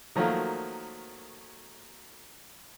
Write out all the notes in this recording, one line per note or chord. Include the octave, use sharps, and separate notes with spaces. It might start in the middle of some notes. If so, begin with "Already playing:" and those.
D#3 F3 F#3 A3 A#3